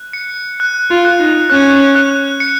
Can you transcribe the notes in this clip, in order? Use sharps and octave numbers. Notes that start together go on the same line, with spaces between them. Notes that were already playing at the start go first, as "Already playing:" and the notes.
Already playing: F#6
C#7
F#6
F4
F#6
D#4
C#4 F#6
F#6
C#7